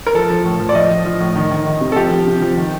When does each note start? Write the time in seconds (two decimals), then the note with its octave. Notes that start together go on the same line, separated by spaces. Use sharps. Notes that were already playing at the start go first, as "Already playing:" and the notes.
0.07 A#4
0.14 F3 A4
0.30 F3
0.45 A2
0.60 F3
0.69 D5
0.75 F3 D#5
0.91 F3
1.06 F3
1.20 A2
1.36 D#3
1.51 D#3
1.66 D#3
1.81 C3
1.92 A4
1.96 F3 G4
2.12 F3
2.26 C3
2.42 F3
2.57 D#3